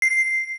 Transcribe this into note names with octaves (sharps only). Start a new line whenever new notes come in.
C7